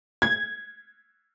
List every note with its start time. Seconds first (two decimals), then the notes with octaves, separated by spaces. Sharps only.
0.22 G#6